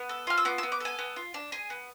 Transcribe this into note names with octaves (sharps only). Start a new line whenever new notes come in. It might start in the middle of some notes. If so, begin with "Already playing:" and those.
Already playing: B3
A4
F4 F6
E6
B3 D6
E6
B3
D6
A4 G#5
B3
F4
D4
G#4 G#5
B3